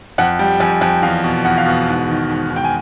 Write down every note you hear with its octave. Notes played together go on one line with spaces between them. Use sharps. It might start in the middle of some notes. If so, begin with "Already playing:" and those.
F2 F#5
G3 G5
F2 G#5
F2 G5
E2 F5
B2
E2 F#5
F5
B2 F#5
G#2
D#3
G#2
G#2
G5
G#5